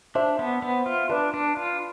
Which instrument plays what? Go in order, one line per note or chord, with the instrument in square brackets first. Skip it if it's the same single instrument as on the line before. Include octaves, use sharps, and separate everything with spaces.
[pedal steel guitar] D4 [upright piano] C5 E5
[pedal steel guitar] B3
B3
F4
[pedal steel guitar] D4 [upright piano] B4 D5
[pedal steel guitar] D4
F4